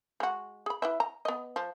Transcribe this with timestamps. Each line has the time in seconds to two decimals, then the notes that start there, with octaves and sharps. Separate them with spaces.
0.20 G#3 F#4
0.66 G#4 B5
0.82 E4 B4 E5
1.00 A#5
1.25 B3 D#5
1.56 F3